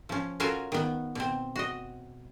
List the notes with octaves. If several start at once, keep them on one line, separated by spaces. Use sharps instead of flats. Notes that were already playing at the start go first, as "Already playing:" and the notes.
F3 C#4
C#4 F4 F#4 A4 A#4 G#5
D#3 B3
B2 C4
F#4 D#5